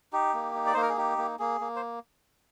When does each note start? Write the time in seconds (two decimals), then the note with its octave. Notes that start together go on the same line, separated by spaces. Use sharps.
0.13 D#4 G4
0.34 A#3
0.55 D#4
0.66 D5
0.74 A#3 C5
0.82 A#4
0.89 G#4
0.97 D#4 G4
1.18 A#3
1.39 A#3 G#4
1.61 A#3
1.76 C5